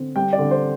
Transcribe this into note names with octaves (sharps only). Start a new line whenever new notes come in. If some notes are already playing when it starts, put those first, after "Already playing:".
Already playing: D3 C4
G3 G5
D5
D3
C5